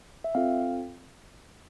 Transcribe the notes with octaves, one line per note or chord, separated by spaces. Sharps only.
E5
C4 F4 A4 F5